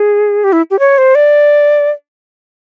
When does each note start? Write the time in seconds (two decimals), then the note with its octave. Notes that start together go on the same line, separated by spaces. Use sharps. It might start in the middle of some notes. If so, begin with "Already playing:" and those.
Already playing: G#4
0.44 G4
0.53 E4
0.71 G4
0.79 C#5
0.98 C5
1.15 D5